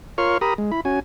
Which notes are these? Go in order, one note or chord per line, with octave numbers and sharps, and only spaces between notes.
F4 A#4 C#5 C6 C#6 F6
G4 A#4 A#5 B5 D#6
G#3
E4 B5
C#4 F#4 G#5